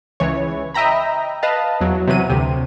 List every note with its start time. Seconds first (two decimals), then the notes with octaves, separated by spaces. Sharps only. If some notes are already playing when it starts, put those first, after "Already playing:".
0.20 C#2 E3 C#5
0.74 D#5 E5 G5 A#5 B5
1.43 B4 D#5 F5 A5
1.81 E2 F#3
2.07 C3 E3 F#3 D#7
2.30 D2 C3